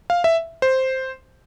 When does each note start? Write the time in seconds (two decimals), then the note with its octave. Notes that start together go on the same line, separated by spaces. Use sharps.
0.10 F5
0.24 E5
0.62 C5